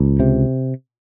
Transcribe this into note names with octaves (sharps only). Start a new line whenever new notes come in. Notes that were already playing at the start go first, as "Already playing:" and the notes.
Already playing: C#2
C3